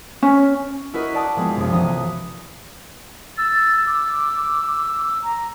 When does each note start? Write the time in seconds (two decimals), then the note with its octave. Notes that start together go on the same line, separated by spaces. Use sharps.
0.22 C#4
0.94 E4 F#4 A#4 B4 D#5
1.14 D5 F#5 A5 D#6
1.36 F3 G#3 B3 C4
1.56 B1 F#2 C3
1.72 E3 F3 B3 D#6
3.38 E6 A6
3.87 D6 E6
5.23 A#5